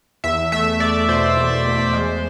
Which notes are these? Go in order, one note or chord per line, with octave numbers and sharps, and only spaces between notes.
E2 E5
A3 E5
A3 D5
B2 C5
E2
E2
G#3